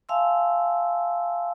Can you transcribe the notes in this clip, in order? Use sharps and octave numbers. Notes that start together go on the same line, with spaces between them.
E5 F5 G#5 A5 C6 E6